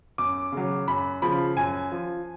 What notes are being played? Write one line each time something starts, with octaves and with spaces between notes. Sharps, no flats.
F#2 D6
C#3 F#3
F#2 B5
C#3 F3 B5
F#2 G#5
F3